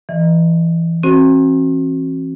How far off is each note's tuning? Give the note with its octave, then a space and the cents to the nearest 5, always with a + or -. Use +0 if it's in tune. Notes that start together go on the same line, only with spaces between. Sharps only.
E3 +15 D#5 -35
C4 +45 F#4 +0 C5 +20